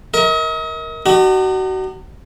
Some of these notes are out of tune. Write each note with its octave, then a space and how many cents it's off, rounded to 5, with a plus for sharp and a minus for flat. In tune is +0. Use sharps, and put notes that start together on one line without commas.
A#4 +0 D#5 +40
D#4 -45 F#4 +30